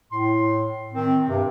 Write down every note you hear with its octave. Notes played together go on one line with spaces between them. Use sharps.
A2 C6
D#3 C4
G2 C3